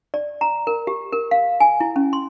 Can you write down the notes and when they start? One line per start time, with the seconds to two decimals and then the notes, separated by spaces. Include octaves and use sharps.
0.14 D5
0.41 A#5
0.67 A#4
0.87 G4
1.13 A#4
1.31 F5
1.60 G#5
1.80 E4
1.96 C#4
2.13 C6